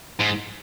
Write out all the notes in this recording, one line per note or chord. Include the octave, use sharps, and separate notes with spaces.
G#2